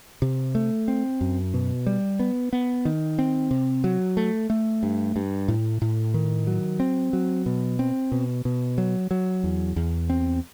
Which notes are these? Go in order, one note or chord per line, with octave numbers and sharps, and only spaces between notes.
C3
A3
C4
F#2
B2
G3
B3
B3
D#3
C4
C3
F#3
A3
A3
G2
G2
A2
A2
D#3
F#3
C4
F#3
B2
C4
B2
B2
F#3
F#3
E2
E2
C4